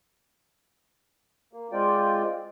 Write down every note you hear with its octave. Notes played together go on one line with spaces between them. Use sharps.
A#3
G#3 C4 F4 D5 G5